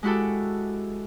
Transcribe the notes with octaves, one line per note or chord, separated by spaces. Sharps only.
G#3 E4 F#4 G4 A4